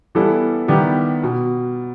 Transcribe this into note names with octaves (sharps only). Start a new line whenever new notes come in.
E3 G3 B3 E4 A4
D#3 G3 B3 E4 G4
B2